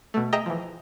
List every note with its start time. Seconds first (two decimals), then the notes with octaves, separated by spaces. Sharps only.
0.14 B2 A3
0.33 G#4 D#5 E5 G5 A#5 D#6
0.46 E3 F3